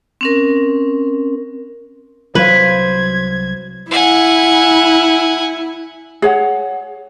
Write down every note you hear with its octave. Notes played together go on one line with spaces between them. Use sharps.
C4 C#4 A#4
C2 F#3 B4 C5 F5 G#6
E4 F#5 G#5
G#4 C#5 F#5